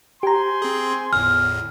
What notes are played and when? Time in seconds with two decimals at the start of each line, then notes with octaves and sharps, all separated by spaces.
0.23 G4 C5 G#5 A#5 C6
0.62 C4 G#4
1.13 G1 E2 A2 F6